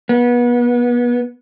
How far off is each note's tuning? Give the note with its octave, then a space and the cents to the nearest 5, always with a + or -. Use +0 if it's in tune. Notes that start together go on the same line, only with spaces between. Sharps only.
B3 -30